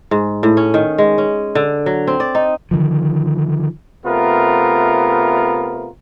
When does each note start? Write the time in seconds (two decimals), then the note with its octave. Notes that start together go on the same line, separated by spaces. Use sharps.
0.11 G#2
0.43 A2
0.57 C#4
0.74 D#3
0.98 G#3
1.18 C#4
1.55 D3
1.86 F#3
2.07 C4
2.20 D5
2.35 D#4
2.71 D3 D#3 F3
4.05 C3 A3 B3 F4 A#4